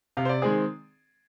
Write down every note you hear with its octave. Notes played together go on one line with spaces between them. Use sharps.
C3 F5
C5
D5
D#3 G#3 C4 G#4